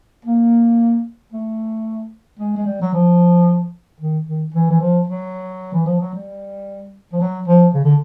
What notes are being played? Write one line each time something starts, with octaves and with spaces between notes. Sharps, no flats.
A#3
A3
G#3
G#3
G3
F#3
F3
D#3
D#3
E3
E3
F3
F#3
E3
F3
F#3
G3
F3
F#3
F3
C#3
D3